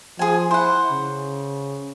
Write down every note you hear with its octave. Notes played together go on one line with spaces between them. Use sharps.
F3 G#4 G#5
E4 C5 F#5
C#3